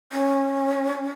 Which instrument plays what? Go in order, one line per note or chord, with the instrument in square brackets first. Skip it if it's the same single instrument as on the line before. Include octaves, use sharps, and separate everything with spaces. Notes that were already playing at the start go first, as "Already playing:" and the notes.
[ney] C#4